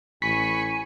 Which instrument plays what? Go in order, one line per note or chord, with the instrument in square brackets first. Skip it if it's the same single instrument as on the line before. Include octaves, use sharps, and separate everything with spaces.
[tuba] A1 [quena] G#5 [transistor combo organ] B5 C#6 [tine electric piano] B6